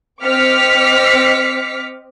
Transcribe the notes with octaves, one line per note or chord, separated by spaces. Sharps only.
C4 D#5 D6 F6 B6 C#7